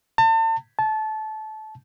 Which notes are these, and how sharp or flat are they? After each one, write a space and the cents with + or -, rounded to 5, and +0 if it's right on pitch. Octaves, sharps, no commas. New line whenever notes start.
A5 +40
A5 -20